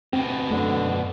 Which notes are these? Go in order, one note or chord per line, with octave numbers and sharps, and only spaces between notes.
D2 B2 C4
F#2 D3 A3